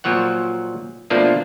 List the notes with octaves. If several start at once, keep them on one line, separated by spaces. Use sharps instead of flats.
A#2 F3 F#3 C#5 F#5
B2 F3 A3 A#3 D4 F4